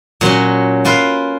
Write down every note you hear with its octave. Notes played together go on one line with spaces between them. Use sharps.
A#2 F#3 C#4
A#3 F4 B4 F5